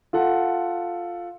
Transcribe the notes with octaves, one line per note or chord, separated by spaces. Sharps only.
F4 A4 F#5